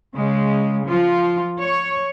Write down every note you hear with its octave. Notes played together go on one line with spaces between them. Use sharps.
C#3 G#3
F3 F4
C#5